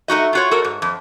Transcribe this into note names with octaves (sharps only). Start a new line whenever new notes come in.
A3 D#4 F#4 D#5
F4 F#4 C#5
F#4 A4 A#4
G#2
F2